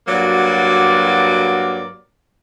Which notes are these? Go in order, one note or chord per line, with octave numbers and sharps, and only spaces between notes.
G2 F#3 A#3 F#4 D5